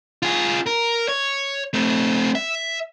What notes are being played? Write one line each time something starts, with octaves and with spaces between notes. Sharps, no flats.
F4 G#4
A#4
C#5
A3 C4
E5